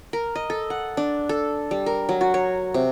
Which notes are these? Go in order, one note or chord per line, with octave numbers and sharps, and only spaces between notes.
A#4
D#5
A4
F#5
D4
A4
G3
A#4
F#3
F#4
C#5
C3